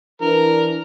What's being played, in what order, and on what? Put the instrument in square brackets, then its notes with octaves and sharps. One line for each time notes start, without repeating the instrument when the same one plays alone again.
[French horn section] E3 D4 [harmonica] A#4